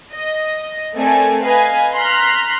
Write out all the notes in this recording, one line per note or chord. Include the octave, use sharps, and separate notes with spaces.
D#5
A3 C4 A4 A#4 D5 G#5
B4 D#5 F5 G#5
A#5 C6 F6 F#6 B6